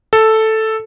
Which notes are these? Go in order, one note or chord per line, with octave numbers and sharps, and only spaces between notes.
A4